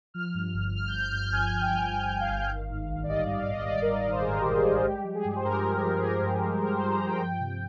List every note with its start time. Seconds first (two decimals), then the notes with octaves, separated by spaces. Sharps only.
0.14 F3 F6
0.34 G2
0.54 G1
0.73 G1 F6
0.88 G6
0.92 F3
0.98 G6
1.02 F6
1.12 G2
1.17 F6
1.32 G1 G#5
1.52 G1
1.61 G5
1.71 F3
1.91 G2
2.10 G1
2.20 F5
2.30 G1
2.50 D#3
2.69 G#2
2.89 A#1
3.03 D5
3.09 G3 D#5
3.24 D#3 D#5
3.37 F5
3.47 G#2
3.53 D#5
3.67 A#1 D5
3.82 A#4
3.88 G3
3.97 A#4
4.07 D#3 C5
4.21 G#4
4.27 G#2 A#4
4.41 A#1 G4
4.56 G#4
4.65 G3
4.70 G#4
4.85 G#3 G4
5.04 F3
5.15 G#4
5.25 G2
5.36 C5
5.44 G2 A#4
5.64 G#3
5.84 F3
5.98 G#4
6.02 G2 A#4
6.22 G2
6.42 G#3
6.61 F3 A#4
6.77 G2 C5
6.91 A#5
7.02 G2 G5
7.21 F3
7.40 C3